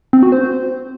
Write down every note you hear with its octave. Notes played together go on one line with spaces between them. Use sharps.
C4
F#4
C5